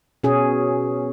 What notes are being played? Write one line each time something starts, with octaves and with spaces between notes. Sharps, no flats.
B2 C#4 G#4